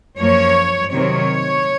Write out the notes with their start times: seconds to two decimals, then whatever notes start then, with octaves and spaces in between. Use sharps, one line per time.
0.19 F#2 F3 A#3 C#5
0.93 C3 D#3 F#3 C4 C#5